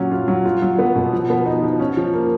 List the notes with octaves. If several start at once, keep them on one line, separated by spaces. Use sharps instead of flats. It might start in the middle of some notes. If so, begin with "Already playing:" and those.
Already playing: A#2 F#3 C#4
F4
F#3
F4
F#3
B3
B2
F3
B3
D#4
F3
C#4
F3
A#3